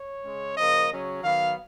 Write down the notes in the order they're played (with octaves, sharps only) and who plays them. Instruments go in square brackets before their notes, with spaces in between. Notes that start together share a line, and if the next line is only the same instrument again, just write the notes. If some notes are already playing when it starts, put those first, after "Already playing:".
Already playing: [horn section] C#5
C#3 G#3 C#4
C#3 F3 A#3 D#5
C#3 F#3 C#4
D#3 F#3 B3 F5